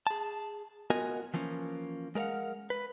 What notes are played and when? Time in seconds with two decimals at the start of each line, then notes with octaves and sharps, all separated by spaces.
0.07 G#4 A5
0.90 B3 F4 F#4 A#4 D#5 G#5
1.34 E3 F3 A#3 C#4
2.15 G#3 A#4 D5 F5 F#5
2.70 B4